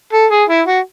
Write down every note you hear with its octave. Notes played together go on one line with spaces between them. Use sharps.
A4
G#4
E4
F#4